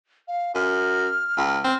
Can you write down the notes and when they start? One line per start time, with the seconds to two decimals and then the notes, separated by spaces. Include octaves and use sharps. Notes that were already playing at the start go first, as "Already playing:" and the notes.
0.28 F5
0.55 F#2 F6
1.37 C#2
1.64 C4